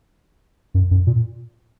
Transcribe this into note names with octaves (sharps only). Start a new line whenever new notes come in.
F#2
F#2
A#2